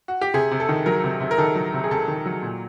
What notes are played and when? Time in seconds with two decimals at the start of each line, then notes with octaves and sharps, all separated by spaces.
0.08 F#4
0.21 G4
0.34 C3 G#4
0.51 C3
0.60 A4
0.69 D#3
0.86 F#3 A#4
1.04 C3
1.20 C3
1.31 A#4
1.38 D#3 A4
1.55 F#3
1.74 C3
1.84 G#4
1.91 C3 A4
2.08 D#3
2.26 F#3
2.43 A#2